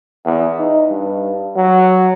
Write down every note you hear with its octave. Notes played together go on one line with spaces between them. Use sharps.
E2
D#4
G2
F#3